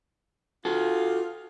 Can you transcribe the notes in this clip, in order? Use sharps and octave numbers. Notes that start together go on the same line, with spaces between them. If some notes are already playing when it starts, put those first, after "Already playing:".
F4 F#4 A4